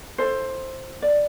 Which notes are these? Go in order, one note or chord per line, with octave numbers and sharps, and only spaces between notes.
E4 A4 C5
D5